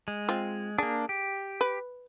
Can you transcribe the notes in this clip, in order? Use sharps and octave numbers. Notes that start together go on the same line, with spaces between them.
G#3
C4 F4
A#3 D4 G#4
G4
B4